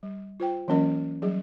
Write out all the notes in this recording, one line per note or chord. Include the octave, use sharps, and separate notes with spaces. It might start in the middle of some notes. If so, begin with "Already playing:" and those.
G3
F4 C5 G5
E3 F#3 A#3 C#4 A#4 D#5
F#3 G3 G#4